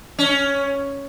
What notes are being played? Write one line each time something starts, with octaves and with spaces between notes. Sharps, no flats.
C#4